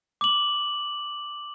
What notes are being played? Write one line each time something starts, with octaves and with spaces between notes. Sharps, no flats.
D6 F#7